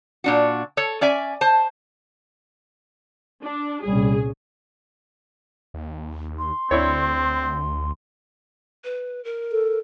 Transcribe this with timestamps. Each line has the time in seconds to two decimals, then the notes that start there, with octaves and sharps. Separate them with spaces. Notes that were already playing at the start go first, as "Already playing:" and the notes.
0.24 A#2 D4 F#4
0.77 A4 C#5
1.01 C#4 D5 E5 G#5
1.41 C5 A5
3.43 D4
3.85 C2 A#2 G3 C#4 G#4
5.74 D#2
6.39 C6
6.71 D2 C4 D4 E4 C#5
8.84 B4
9.25 A#4
9.52 A4